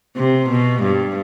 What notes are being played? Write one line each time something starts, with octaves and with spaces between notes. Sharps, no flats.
C3
B2
G2